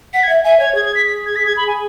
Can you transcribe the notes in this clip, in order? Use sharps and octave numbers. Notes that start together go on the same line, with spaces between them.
F#5 B6
G#6
E5
E5 G#5
C#5 G#6
G#4 G#6
G#6
B6
B6
G#6
B6
G#6
B5
G#5